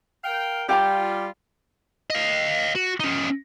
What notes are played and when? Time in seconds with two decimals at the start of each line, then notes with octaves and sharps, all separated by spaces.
0.24 A#4 F5 G5
0.69 G3 F4 G4 G5 A#5
2.10 D#5 F5
2.75 F#4
3.00 C#4 D#4